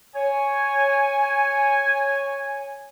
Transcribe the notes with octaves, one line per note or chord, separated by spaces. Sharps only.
C#5 G#5